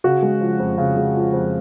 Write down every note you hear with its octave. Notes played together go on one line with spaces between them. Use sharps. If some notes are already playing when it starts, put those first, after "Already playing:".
C#3 F#4
G#3
F3
F2
C#3
G#3
F3
F2